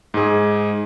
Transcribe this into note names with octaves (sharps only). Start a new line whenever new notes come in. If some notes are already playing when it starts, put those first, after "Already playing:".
G#2 G#4